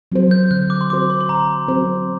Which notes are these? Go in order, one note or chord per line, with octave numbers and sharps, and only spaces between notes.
F#3 C4 F#4 C5
G6
D3 F#6
D6
C6
F#3 C4 F#4 C5 D6
C6
C6
D3 A#5
F#3 C4 F#4 C5